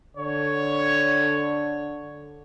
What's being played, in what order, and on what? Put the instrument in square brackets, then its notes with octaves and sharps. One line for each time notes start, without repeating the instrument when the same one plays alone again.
[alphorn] D3 [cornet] C#5